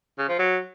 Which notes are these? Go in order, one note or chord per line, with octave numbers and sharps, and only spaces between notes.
C#3
F3
F#3